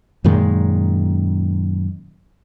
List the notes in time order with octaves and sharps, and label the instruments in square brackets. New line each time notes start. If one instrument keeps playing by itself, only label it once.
[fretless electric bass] F#2 A#2 D#3 G#3